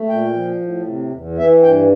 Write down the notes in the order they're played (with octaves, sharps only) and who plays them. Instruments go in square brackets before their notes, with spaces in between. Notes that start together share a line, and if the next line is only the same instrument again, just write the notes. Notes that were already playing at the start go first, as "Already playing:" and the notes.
Already playing: [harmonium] A3
A#2 G5
F3
A2
C3
E2
E3 E5
G2 G5